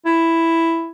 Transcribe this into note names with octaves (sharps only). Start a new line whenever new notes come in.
E4